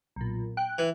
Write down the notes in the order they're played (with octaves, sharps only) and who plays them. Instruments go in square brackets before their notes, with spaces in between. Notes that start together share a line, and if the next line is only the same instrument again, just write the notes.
[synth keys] B1 A#2
G5 F#6
[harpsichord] E3